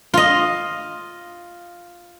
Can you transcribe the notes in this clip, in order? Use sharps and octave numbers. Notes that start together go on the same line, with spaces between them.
F4 D#5